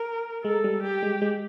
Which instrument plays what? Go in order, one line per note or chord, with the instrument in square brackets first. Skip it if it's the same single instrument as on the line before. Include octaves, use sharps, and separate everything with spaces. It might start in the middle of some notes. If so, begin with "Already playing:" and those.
Already playing: [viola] A#4
[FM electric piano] G#3 [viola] A4
[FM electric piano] G3
[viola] G4
[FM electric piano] G#3
G#3